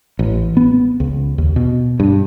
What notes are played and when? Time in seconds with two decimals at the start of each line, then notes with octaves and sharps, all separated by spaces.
0.19 A1
0.57 B3
1.00 C#2
1.38 D#2
1.56 B2
2.00 G2